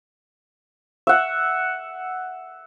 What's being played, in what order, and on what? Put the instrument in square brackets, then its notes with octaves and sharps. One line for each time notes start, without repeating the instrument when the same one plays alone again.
[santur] E5 F#5